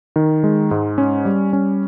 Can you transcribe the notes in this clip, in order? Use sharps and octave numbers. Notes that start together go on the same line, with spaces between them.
D#3
G#3
G#2
C#4
G3
C#4